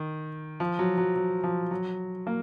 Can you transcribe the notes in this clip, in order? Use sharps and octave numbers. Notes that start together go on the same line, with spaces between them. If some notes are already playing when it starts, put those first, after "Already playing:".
Already playing: D#3
F3
F#3
F#3
F#3
F3
F#3
A#3